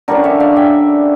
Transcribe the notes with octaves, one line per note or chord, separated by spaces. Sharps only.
D3 G3 C#4 A#4 D5
C#5 E5
D5 F5
E5 G5